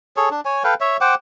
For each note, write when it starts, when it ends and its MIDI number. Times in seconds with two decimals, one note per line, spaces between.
0.17 0.29 68
0.17 0.29 69
0.17 0.29 73
0.31 0.41 62
0.45 0.63 73
0.45 0.63 80
0.64 0.74 69
0.64 0.74 71
0.64 0.74 77
0.64 0.74 79
0.81 0.97 73
0.81 0.97 76
1.01 1.15 72
1.01 1.15 78
1.01 1.15 79
1.01 1.15 86